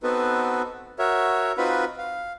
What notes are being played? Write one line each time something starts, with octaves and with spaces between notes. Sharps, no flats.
B3 C4 D#4 F#4 A4 B4
F#4 A#4 C#5 E5
C4 D#4 F4 F#4 B4 B5
F5